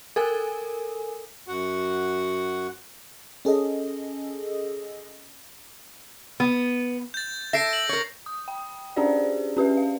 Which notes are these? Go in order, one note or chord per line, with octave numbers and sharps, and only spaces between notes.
A4 A#4 G#5
F#2 F#4 F#5
C#4 G#4 A4 D#5
B3
G6 A6
A4 E5 A#6 C7 D7
F#7
A#4 C#5
D#6
G5
C#4 D4 G4 G#4 C5 D5
C#4 G4 B4 E5
F5